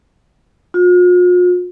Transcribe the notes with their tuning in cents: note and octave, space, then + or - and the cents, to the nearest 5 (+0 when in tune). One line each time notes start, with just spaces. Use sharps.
F4 +45